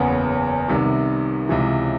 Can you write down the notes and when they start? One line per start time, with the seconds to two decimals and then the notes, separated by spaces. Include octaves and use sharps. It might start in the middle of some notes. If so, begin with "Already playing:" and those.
Already playing: F#1 E2 C#3 B3 C#4
0.68 C2 C3 D#3
1.49 C#2 C3 E3